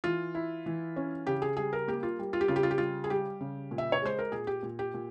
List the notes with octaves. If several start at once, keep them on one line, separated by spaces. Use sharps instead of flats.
E3 F4
E4
E3
C#4
C#3 G4
G#4
G3 G#4
A#4
A#3 G4
F4
G3
F4
G4
C#3 F4
G4
F4
G4
G3 F4
G#4
G3 G4
C#3
A#2
E5
C#5
G#3 C5
A#4
A#2 G#4
G4
A#2
G4
A#2